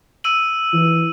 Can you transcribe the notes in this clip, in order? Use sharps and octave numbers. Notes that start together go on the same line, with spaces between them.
E6 D#7 F#7
E3